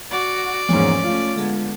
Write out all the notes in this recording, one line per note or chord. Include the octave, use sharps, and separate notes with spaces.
F#4 D5
E2 G#2 F3 G#3 A#3 C#4 C#5
A3 C#4 F4
D3 G#3 B3